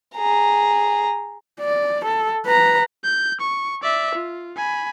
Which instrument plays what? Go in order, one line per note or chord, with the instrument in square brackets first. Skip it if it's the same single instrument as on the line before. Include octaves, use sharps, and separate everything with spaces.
[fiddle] G#4 A#5
[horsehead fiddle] D5
A4
B4 A#5
[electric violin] G6
C#6
D5 E5
F4
G#5 B5